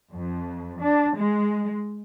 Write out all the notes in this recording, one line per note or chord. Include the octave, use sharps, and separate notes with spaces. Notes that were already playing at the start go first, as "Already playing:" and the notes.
F2
D4
G#3